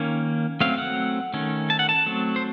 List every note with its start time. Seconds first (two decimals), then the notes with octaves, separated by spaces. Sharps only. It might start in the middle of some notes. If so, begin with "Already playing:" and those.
Already playing: D#3 A#3 C#4
0.61 F#3 A3 C4 F5
0.78 F#5
1.34 D#3 A3 C#4
1.70 A5
1.79 F#5
1.89 A5
2.06 F#3 A3 C4
2.36 C5